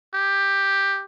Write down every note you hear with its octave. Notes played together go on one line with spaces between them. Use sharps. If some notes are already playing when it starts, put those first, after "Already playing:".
G4